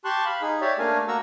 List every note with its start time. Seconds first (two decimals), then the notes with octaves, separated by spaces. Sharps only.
0.05 G4 A5 C6 C#6 F#6
0.26 F5 B5
0.42 D#4 G#4
0.61 G4 C#5 D5 E5
0.79 A3 A#3 D4 A#4 F5 G#5
1.08 A#3 F#4 A#5 C#6 E6